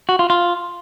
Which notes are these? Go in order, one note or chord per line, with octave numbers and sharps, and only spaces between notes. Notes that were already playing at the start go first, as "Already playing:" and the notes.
F#4
F4
F4